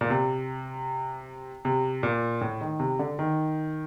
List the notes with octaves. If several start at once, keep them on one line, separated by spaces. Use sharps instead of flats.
A#2
C3
C3
A#2
A2
D#3
C3
D3
D#3